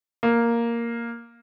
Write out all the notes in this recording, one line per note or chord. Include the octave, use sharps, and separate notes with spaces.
A#3